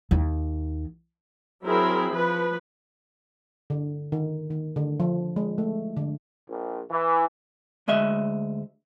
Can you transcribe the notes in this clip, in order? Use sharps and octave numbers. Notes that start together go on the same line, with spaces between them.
D#2 D#3
F#3 C4 E4 G#4 A#4 B5
F3 B4
D3
D#3
D#3
D3
F3
G#3
A3
D3
A#1
E3
D2 G#3 D#5 E5